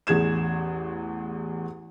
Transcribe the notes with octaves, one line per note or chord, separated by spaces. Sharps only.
A1 E2 G#4 G#6 E7